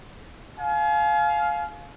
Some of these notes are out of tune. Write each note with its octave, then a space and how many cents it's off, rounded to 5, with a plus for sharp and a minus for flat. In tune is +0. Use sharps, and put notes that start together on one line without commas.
F5 +0 G#5 +40